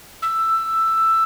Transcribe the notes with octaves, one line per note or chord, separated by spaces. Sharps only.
E6